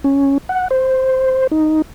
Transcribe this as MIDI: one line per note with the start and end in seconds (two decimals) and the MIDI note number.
0.04 0.38 61
0.49 0.68 78
0.71 1.47 72
1.51 1.82 63